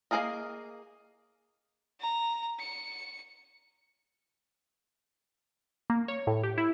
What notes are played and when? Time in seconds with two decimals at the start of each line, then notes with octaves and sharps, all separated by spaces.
0.11 A#3 D#4 G#4 A#4 D#5
2.00 A#5
2.59 C#7
5.90 A#3
6.08 C#5
6.27 A2
6.43 G4
6.58 E4